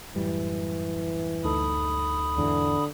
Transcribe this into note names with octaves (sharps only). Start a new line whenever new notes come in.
F#2 A2 E3 G3
D2 D#4 A4 B5 D#6
E2 G#2 D3 E3